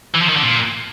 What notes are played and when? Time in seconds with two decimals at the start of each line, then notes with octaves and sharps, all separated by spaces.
0.14 E3
0.21 F3
0.29 D#3
0.36 D3
0.43 A#2